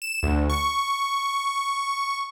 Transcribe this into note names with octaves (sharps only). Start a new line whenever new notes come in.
E7
D2
C#6